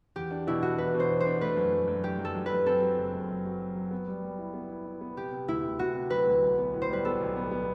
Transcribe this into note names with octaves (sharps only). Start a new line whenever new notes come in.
E2 G4
D4
B2 E4
D4 F#4
E2 B4
B2
C5
E2
C5
D4
A3 B4
F#2
F#2
F#2
F#2 G4
F#2
A4
F#2
B4
F#2
C4 A4
F#3
F#1
F#2
F#2
F#3
F#3
F#3
B3
G3
G3
E4
B3
E4
E4
B3
C3 G4
C3
D2 E4
D2
C3 F#4
C3
F#3 B4
D2
B1
B3
A2
C5
G3 B4
B3 A4
B1
B3
B3